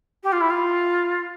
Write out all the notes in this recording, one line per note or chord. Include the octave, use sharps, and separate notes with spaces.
G4
F4
E4
F4